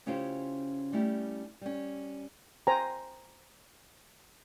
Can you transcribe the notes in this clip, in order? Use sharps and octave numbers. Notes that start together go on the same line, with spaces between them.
C#3 C#4 E4 F4 G4 C5
G3 A3 C#4 E4 G4
G3 C#4
C5 G5 G#5 A#5